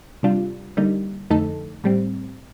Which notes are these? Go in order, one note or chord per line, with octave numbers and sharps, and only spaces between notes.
C3 G3 D4 F4
D3 G3 A#3 D#4
F2 D3 A3 D#4 A4
A2 G3 C4